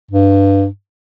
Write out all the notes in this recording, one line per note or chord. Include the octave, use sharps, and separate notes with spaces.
G2